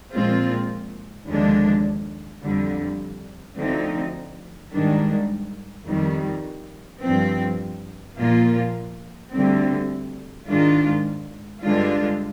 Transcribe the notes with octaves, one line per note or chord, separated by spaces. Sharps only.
A#2 F3 G#3 C4 F4
D#2 D3 F3 G#3 D4
F2 D3 G3
D2 D3 F3 C4 D#4
G#2 D#3 G3 D4
F2 D#3 G3
G2 F3 C4
A#2 F3 A#3 F4
D2 D3 G3 C4
G#2 D#3 G#3 D4 F4
G2 D3 G#3 D4 F4